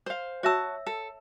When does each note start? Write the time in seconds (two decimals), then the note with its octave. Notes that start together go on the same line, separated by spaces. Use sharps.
0.06 C5 F5
0.43 F#4 C#5 E5 A5 E6
0.86 A4